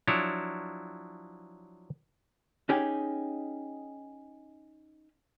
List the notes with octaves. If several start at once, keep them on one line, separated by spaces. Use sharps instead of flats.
F3 F#3 D4 E4 C#5
C#4 D#4 G4 G#4